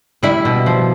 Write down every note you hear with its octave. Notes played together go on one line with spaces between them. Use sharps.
G3 E4
B2
F3